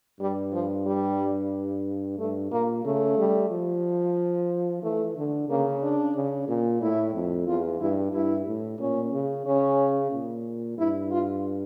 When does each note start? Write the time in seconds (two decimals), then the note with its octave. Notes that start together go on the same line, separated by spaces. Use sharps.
0.20 G2 G3
0.53 F3
0.86 G3
2.18 G2 A3
2.51 A#2 A#3
2.85 C#3 A3
3.18 G3
3.50 F3
4.82 E3 A3
5.17 D3
5.49 C#3 A#3
5.83 D4
6.15 C#3
6.48 A#2
6.81 A2 E4
7.14 F2
7.47 E2 F4
7.80 G2 E4
8.13 G2 E4
8.47 A2
8.79 A#2 C#4
9.13 C#3
9.46 C#3 C#4
10.11 A#2
10.78 G2 E4
11.11 F4